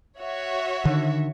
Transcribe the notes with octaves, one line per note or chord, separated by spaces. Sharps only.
F#4 C#5 E5
D3 D#3